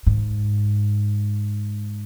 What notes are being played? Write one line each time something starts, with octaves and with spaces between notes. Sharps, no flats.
G#2